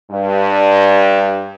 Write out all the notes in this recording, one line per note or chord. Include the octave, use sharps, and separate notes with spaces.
G2